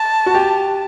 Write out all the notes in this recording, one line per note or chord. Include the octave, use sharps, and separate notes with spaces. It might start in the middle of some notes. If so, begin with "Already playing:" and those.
Already playing: A5
F#4
G4